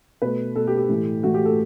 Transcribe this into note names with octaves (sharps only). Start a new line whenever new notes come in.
B2 A3 B4
B2 A3 A4
G4
G4
A2 E3 A3
A2 E3 A3 F#4
G4
A4